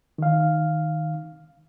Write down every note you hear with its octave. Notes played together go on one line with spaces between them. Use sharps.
D#3 F5